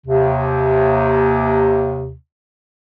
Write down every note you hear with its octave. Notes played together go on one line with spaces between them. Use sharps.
D#2 C3